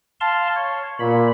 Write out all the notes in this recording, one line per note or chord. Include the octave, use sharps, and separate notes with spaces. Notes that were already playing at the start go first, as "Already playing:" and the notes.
F5 A5 C6
C#5
A#2 B5